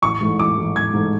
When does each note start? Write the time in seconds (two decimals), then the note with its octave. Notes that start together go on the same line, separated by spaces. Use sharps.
0.02 A1 C#6
0.21 G#2 E3 A3
0.39 A1 D6
0.57 G#2 E3 A3
0.75 A1 G#6
0.93 G#2 E3 A3